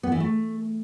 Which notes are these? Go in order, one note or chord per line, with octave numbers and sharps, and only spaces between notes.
B3
E3
A3